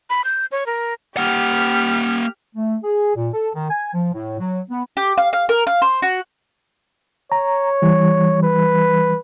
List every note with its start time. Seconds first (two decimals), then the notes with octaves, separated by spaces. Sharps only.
0.10 B5
0.24 G6
0.52 C#5
0.66 A#4
1.17 A#3 G4 F#5 F6
2.56 A3
2.83 G#4
3.15 A#2
3.32 A4
3.54 D#3
3.70 G#5
3.93 F3
4.12 A2
4.39 F#3
4.69 B3
4.97 G4
5.18 F5
5.33 F5
5.49 A#4
5.67 F5
5.82 C5
6.02 F#4
7.32 C#5 A#5
7.82 E3 G3
8.43 B4